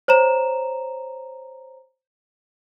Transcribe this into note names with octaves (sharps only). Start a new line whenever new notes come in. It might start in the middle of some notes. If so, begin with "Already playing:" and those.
C5 C#5 A#5 E7